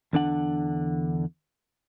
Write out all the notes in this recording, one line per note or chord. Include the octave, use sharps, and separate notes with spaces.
E2 D3 D4 F#5